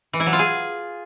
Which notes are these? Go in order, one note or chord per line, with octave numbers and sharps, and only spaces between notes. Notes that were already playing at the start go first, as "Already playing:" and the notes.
E3
E4
F#3
F4
G#4